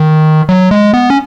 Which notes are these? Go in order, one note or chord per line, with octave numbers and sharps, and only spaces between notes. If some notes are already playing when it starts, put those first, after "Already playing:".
Already playing: D#3
F#3
G#3
B3
C#4